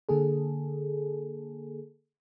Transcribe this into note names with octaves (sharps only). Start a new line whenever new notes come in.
D3 A#3 G#4 A4